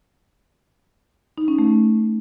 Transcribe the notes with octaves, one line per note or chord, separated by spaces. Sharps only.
D#4
C#4
A3